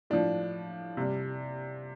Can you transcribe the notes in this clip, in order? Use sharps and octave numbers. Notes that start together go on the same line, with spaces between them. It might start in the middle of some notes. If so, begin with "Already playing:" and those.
A2 F3 D4
C3 G3